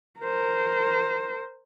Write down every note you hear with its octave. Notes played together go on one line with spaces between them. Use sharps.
A#4 C5